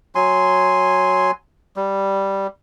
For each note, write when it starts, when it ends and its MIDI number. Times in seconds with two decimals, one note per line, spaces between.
0.15 1.31 54
0.15 1.31 80
0.15 1.31 84
1.76 2.47 55